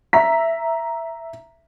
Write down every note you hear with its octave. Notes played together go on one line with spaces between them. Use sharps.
E5 A#5 B6